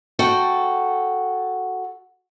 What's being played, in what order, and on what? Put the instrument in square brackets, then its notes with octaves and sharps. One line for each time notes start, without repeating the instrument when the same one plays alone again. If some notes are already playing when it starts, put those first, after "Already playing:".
[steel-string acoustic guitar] F#4 A4 G5